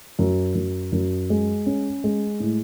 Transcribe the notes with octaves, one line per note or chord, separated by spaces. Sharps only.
F#2
F#2
F#2
G#3
C#4
G#3
A2